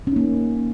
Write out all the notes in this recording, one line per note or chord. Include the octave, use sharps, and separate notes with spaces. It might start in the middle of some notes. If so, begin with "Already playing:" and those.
A#3 C#4 D#4